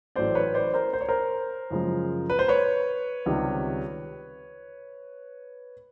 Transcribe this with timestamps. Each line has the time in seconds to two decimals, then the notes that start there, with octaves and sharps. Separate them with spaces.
0.16 A1 A2 F#3 A3 C5 D5
0.35 B4 C#5
0.54 C5 D5
0.74 A#4 C5
0.93 C5
1.01 C#5
1.09 A#4 C5
1.70 F#2 C#3 F3 G#3
2.30 B4
2.39 C5
2.48 B4 C#5
3.26 C#2 C3 D#3 G3